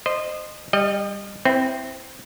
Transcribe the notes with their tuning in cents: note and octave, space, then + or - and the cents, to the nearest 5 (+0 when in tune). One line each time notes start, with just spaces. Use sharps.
C5 -5 D#5 -25
G3 +20 D#5 -25
C4 +0 E4 +0 B4 +30